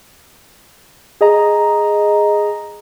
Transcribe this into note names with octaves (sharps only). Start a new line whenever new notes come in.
G#4 D#5 A#5